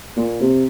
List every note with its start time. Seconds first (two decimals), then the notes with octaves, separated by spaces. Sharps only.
0.17 A#2
0.41 C3